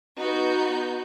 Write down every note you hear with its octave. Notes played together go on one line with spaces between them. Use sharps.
B3 D#4 F#4 G6